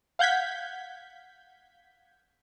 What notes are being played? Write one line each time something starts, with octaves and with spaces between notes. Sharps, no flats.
F5 F#5 G6 G#6 B6